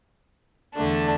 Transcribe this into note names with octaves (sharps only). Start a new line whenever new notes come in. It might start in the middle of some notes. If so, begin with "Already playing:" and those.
E2 D3 A3 D4